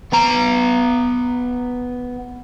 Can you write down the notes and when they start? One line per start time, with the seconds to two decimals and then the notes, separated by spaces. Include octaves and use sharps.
0.13 B3 A#5